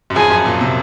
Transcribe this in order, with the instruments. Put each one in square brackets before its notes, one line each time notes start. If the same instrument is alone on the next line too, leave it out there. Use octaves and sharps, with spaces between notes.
[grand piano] F#2
[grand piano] F2 [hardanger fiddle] G#4
[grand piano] F#2
A#2
C3